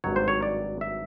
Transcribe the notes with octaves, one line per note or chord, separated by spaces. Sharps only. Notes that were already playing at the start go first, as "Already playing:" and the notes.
G#1 G2 D#3 F#3 C#5
C5
C#5
D5
E5